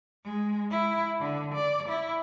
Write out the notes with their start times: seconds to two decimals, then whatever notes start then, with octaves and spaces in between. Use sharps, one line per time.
0.24 G#3
0.70 E4
1.20 D3
1.54 D5
1.89 E4